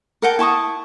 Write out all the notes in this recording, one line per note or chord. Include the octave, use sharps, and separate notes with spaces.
A#4 F#5 G5 A5
E4 A5 C#6 D#6